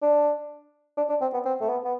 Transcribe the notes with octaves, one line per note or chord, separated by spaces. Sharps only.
D4
D4
D4
C4
B3
C4
A3
B3
B3